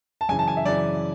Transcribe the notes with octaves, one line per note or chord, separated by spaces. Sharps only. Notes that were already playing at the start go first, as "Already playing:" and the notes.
A5
F#2 C#3 E3 G#5
A5
G#5
E5
F#2 C#3 E3 D5